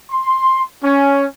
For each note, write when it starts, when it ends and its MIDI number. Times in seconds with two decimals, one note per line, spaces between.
0.11 0.63 84
0.83 1.25 61